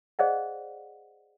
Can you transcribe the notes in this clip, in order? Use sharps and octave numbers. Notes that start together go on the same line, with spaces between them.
G#4 C5 D5 D#5 F5 F#5